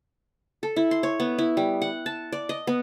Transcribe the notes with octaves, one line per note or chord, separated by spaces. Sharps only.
A4
E4
C6
C#5
B3
E4
G3
F#5
A5
D5
D#5
B3